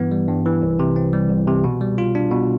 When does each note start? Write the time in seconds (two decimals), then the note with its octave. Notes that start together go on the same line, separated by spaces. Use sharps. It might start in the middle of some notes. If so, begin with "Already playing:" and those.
Already playing: G2 E3 B3
0.12 G3
0.28 G2
0.46 E3
0.62 C2
0.79 C3
0.96 C4
1.13 G3
1.30 C2
1.47 C3
1.64 B2
1.81 G3
1.98 F4
2.15 D4
2.31 B2